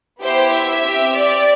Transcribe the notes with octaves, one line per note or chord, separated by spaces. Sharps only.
B3 E4 G4 C5
E5
C4 G4
D5